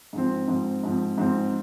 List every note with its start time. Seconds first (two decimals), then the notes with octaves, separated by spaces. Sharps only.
0.13 G#2 F3 C4
0.47 G#2 F3 C4
0.83 G#2 F3 C4
1.18 G#2 F3 C4